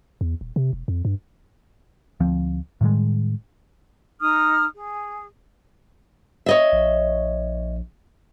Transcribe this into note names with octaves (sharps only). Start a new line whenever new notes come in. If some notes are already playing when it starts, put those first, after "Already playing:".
E2
D#1
C3
E1
F2
G2
D2 F3 C4
A2 D#3 G3 G#3
D#4 D#6 F6
G#4
C#5 D#5 E5
A#1